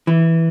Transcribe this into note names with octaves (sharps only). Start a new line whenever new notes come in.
E3